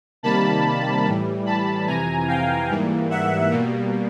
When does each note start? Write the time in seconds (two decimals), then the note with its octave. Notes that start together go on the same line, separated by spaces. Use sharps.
0.23 C3 D#3 G3 A#3 A5 B5
1.05 A2 E3 G3
1.46 A5 B5
1.87 F2 C3 E3 G#5 A#5
2.28 F5 G5
2.69 G#2 E3 G3 A#3
3.10 E5 F#5
3.51 B2 G3 A#3